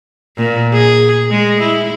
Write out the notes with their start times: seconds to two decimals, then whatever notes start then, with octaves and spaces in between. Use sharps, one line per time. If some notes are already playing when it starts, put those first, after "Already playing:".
0.37 A#2
0.73 G#4
1.31 G#3
1.61 E4